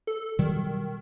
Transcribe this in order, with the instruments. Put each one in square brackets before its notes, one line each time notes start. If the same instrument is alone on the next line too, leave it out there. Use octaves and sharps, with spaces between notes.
[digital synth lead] A4
[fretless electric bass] B2 F#3 G3 [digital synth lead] D#3